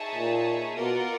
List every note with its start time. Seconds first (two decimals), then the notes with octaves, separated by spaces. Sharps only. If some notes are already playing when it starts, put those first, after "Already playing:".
Already playing: D#4 G#4 C#5 E5 A5
0.15 A#2
0.75 B2 F4 A#4 D5 F#5